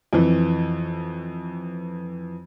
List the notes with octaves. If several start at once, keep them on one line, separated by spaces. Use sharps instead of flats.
F2 E3